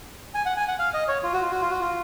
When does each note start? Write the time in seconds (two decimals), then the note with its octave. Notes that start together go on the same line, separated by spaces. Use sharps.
0.35 G#5
0.46 F#5
0.57 G#5
0.68 F#5
0.79 F5
0.94 D#5
1.08 C#5
1.23 F4
1.33 F#4
1.42 F4
1.51 F#4
1.61 F4
1.71 F#4
1.81 F4